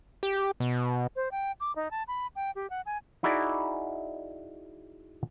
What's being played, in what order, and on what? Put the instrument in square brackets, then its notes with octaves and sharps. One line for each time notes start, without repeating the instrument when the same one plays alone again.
[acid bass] G4
B2
[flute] C5
G5
D6
D#4
A5
B5
G5
G4
F#5
G#5
[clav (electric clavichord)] D#4 E4 F#4 G#4 D5